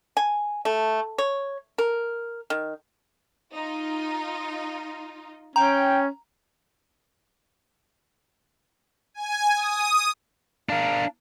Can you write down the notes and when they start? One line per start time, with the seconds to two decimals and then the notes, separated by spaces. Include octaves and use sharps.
0.17 G#5
0.65 A3
1.18 C#5
1.78 A#4
2.50 D#3
3.53 D#4 F4
5.56 C#4 G5 A#5
9.14 G#5
9.56 D#6
10.69 D4 A#4 F5